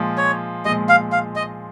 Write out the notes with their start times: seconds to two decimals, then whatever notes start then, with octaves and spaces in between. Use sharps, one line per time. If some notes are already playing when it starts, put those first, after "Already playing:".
Already playing: A#2 F3 G#3
0.18 C#5
0.65 A#2 F3 G#3 D#5
0.89 F5
1.12 F5
1.36 D#5